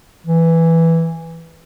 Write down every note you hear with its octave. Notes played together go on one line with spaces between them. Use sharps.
E3